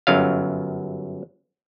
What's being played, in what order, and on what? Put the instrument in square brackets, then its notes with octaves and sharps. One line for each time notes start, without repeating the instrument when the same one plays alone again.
[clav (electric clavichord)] G1 F#2 F#3 F5